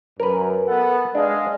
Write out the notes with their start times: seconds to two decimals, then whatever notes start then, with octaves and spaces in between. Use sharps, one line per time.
0.20 F#2 A#4 B4
0.67 B3 A4 F#5
1.15 G#3 D4 D#5 F5